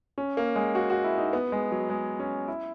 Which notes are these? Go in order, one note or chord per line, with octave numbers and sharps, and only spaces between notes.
C#4
A#3
G#3
F#4
F#4
E4
D#4
B3
G#3
F#3
G#3
C#4
E4